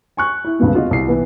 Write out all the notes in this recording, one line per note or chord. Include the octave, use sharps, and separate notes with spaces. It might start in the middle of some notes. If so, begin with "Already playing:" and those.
G#5 C#6 F#6
E4
C#2 G2 D3 B3 C4
F4 F#4 D#5
C2 C7
E3 B3